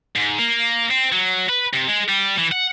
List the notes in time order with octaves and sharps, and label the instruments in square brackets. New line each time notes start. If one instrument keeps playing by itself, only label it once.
[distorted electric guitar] G#2
A#3
C4
F#3
B4
C3
G#3
G3
E3
F#5